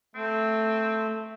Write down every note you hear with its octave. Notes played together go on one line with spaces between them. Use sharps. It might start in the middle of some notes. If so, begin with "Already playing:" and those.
A3 C4